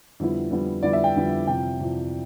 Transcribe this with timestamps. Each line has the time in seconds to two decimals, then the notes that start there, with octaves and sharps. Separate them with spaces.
0.20 F2 D3 G3 B3 E4
0.51 F2 D3 G3 B3 E4
0.83 F2 D3 G3 B3 E4 D5
0.93 E5
1.04 G5
1.16 F2 D3 G3 B3 E4
1.47 F2 C3 E3 G5
1.80 F2 C3 E3